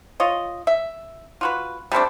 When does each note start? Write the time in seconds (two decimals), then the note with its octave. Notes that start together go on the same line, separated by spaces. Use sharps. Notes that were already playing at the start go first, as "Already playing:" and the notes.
0.20 F4 C#5 D#5
0.67 E5
1.41 F4 F#4 B4
1.92 G3 A3 C4 D4